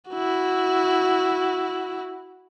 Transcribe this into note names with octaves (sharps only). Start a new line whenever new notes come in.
E4 F#4